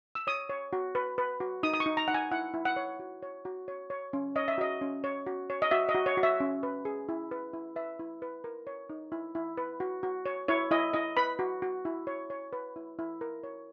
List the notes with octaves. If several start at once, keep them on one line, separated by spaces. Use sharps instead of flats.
E6
C#5 D#6
C#5
F#4
B4
B4
F#4
D#4 D#6
D#6
C#6
D#4
A#5
D#4 F#5
G#5
E4 F#5
E4
F#5
C#5
F#4
C#5
F#4
C#5
C#5
C#4
C#5 D#5
E5
F#4 D#5
C#4
C#5
F#4
C#5
D#5
F#4 E5
D#5
F#4
C#5
F#4
E5
C#4
B4
G#4
E4
B4
E4
B4 E5
E4
B4
A#4
C#5
D#4
E4
E4
B4
F#4
F#4
C#5
E4 C#5
E4 D#5
E4 D#5
B4 B5
F#4
F#4
E4
C#5
C#5
B4
E4
E4
A#4
C#5